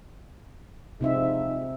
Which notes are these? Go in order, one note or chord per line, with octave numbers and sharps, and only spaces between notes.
C3 F3 G#3 C4 D#4 E5